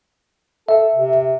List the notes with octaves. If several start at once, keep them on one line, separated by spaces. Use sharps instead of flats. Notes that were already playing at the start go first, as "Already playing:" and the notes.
A4 E5
C3